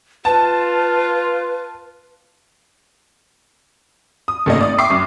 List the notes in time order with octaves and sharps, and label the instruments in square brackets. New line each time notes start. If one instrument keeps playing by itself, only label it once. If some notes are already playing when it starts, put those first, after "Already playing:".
[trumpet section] F4 [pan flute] B4 [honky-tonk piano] A5
[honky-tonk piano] D#6
G#1 D#3 A3 A#3 C#4 D#5
D5 D#6
E5 G5 C#6 D6 C7
F#2